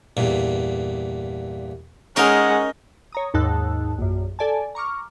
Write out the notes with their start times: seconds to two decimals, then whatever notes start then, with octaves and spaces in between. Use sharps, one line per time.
0.17 E2 G2 A#2
2.16 G#3 C#4 D#4 A#4 C#5 D#5 F#5
3.12 C#5 A#5 D#6
3.34 D#2 G#2 D#4 A5 E6 F#6
3.98 A#1 F#2
4.39 A4 D5 G#5 A5
4.75 A#5 C#6 D6 F6